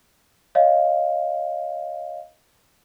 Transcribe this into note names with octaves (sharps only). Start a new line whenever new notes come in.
C#5 D#5 F5